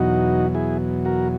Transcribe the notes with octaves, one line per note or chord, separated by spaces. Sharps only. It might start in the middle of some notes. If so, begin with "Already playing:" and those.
Already playing: E2 B2 F#3 D#4 F#4
E4 G#4
F#4 A#4